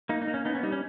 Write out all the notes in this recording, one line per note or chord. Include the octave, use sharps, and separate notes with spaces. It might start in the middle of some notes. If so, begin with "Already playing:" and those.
A#3 D#4
D#4
A#3
C#4
B3 D#4
C#4
G3 D#4
C#4